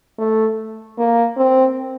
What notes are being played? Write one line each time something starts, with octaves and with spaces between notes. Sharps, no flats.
A3
A#3
C4